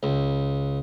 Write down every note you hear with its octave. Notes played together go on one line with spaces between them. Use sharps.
C#2